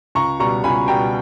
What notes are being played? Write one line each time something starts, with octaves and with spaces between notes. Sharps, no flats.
C#2 A#5 C#6
B2 G3 A#5 C#6
C#2 G#5 B5
B2 G3 G5 A#5